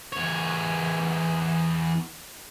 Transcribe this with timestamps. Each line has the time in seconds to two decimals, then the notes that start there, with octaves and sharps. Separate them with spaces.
0.13 E2 C#5